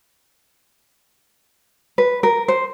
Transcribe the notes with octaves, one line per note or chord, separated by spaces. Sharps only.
B4
A#4
C5